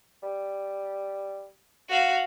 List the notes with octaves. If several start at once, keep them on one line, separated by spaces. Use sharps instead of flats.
G3
F#4 F5